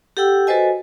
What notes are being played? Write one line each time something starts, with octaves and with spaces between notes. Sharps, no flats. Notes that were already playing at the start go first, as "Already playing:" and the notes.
G4 A4 F#5 G5 E6
F#4 A4 B4 C5 D#5 G#5